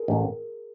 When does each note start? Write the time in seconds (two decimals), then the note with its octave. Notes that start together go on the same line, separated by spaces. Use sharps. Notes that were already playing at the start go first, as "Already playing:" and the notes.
Already playing: G#4 A#4
0.08 A1